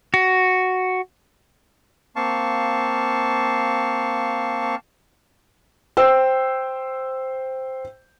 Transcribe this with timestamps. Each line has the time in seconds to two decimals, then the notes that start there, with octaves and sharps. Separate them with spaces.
0.14 F#4
2.16 A#3 C4 F5 A5 C#6
5.97 C5 G5 E6